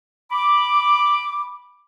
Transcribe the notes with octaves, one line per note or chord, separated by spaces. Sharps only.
B5 D6